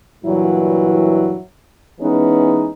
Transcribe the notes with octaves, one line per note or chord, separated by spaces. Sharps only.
G2 A#2 E3 F#3 E4
E3 G#3 B3 C#4 D#4